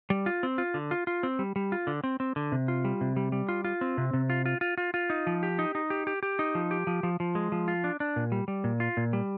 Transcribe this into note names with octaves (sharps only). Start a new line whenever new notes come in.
G3
F4
C4
F4
D3
F4
F4
C4
G3
G3
F4
D3
C4
C4
D3
C3
F4
G3
C3
G3
G3
F4
F4
C4
C3
C3
F4
F4
F4
F4
F4
D#4
F3
G4
D#4
D#4
G4
G4
G4
D#4
F3
G4
F3
F3
F3
G#3
F3
F4
D4
D4
A#2
G3
G3
A#2
F4
A#2
G3